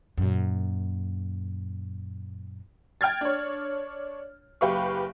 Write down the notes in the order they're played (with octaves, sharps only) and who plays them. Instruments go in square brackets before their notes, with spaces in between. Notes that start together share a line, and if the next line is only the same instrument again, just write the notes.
[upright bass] F#2 A#2
[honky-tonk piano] G5 F6 G#6 A6
D4 C#5
F#1 G4 B4 F5 C#6